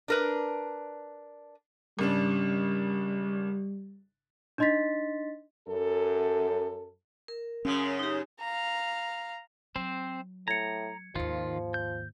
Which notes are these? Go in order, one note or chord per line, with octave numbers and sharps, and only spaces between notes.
D4 A#4 B4
G#1 C#3 G3 D4
D4 D#4 D#5 C6 A6 B6
F#2 A4
A#4
F#2 C#3 C#4
D#4 G4
F5 A#5
F#3 C4 C5
A2 A#5 G#6 C#7
D#2 G#2 D#3 F3 F4
G6